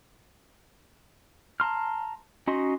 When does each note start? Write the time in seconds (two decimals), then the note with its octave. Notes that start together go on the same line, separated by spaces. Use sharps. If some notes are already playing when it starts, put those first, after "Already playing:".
1.60 A5 A#5 C6 F6
2.47 C#4 D#4 F#4 D#5 C6